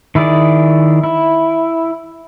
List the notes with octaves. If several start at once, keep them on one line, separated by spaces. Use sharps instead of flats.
D#3 E4 G#4 D5
E4